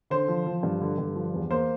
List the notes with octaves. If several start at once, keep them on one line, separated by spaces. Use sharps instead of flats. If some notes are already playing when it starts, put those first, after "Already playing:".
D3 C5
F3
F3
G2
D3
G2
F3
E2
A#3 C5